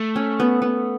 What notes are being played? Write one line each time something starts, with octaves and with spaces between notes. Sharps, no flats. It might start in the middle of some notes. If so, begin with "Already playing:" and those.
Already playing: A3
C#4
B3
B3